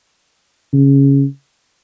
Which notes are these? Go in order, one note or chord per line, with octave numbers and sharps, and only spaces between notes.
C#3